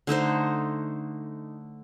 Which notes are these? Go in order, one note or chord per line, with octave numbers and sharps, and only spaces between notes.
D3 A3 D#4 C5